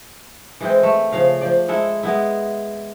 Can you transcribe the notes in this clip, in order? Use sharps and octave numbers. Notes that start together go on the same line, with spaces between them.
E3 G#3 C4
A3
C#3 F3 F5
F3 D5
G#3 E4 A4
G#3 B3 E4